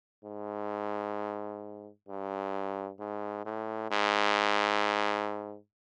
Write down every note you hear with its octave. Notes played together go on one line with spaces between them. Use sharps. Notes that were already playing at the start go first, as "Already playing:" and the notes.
G#2
G2
G#2
A2
G#2